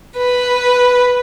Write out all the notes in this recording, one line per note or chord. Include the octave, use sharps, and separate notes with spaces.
B4